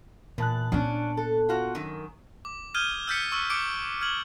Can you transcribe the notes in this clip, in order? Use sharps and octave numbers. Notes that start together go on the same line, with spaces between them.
E2 A#2 A5 F#6
B3 C#4 D4
A4
F4 F#4
F#2 D#3
D6
D#6 F6 G6 G#6 D#7 G7
E6 F6 G6 A6 B6 C#7
C#6 E6 F#6 C#7
D6 D#6 C#7 D7
F6 G#6 F#7